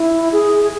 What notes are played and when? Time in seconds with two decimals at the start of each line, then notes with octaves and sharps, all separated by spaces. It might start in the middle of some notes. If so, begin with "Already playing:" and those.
Already playing: E4
0.32 G#4